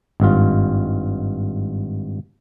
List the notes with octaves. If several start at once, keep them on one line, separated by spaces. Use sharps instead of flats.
G#1 G2 F4